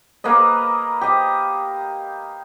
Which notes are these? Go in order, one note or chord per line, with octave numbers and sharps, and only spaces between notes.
A#3 A#4 B4 D#5
G4 D#5